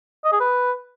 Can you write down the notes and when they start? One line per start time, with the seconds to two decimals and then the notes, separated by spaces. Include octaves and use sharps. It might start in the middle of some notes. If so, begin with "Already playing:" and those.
0.24 D#5
0.32 G#4
0.40 B4